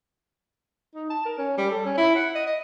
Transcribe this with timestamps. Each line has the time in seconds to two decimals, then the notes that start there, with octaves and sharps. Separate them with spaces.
0.95 D#4
1.10 A5
1.25 A#4
1.38 C#4
1.58 G3
1.71 A4
1.85 C#4
1.98 E4
2.16 F#5
2.35 D#5
2.46 D#5